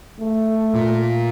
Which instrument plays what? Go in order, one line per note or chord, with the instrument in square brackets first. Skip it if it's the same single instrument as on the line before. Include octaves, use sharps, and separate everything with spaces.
[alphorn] A3
[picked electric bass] A#2